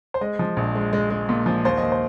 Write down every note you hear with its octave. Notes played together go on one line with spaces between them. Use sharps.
C5
G#3 D#5
F3
A#1
G#3
G#3
G#3
A#2
F3
D#2 C5
D#2 D#5
C5